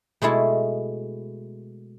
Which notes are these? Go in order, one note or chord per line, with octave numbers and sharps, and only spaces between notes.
B2 G#3 A3 E4 A5